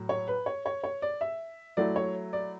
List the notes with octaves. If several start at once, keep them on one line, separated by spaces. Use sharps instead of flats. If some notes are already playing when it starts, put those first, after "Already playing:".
Already playing: A2 F#3
C#5
B4
C#5
C#5
C#5
D5
E5
F#3 A3 E4 D5
C#5
D5